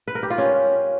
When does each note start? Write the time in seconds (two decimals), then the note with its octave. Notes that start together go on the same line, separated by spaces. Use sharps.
0.08 B4
0.15 A#4
0.23 G4
0.30 F4
0.38 C#4